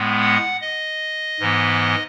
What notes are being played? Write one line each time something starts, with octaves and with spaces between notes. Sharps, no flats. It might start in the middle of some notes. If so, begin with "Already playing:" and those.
Already playing: A2 G#3 B3
F#5
D#5
G#2 E3 B3